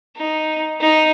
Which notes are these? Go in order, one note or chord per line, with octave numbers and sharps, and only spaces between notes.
D#4
D#4